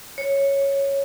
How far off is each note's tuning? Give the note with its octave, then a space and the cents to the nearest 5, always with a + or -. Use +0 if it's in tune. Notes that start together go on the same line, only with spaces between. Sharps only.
C#5 -5